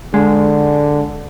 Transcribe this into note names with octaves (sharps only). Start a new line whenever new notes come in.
D3 G#3